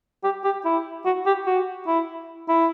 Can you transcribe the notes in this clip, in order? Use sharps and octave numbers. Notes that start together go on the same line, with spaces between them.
G4
G4
E4
F#4
G4
F#4
E4
E4